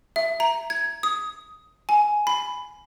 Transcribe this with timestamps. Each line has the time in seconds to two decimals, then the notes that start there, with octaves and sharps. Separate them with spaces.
0.16 E5
0.40 A#5
0.70 G#6
1.03 D#6
1.89 G#5
2.27 B5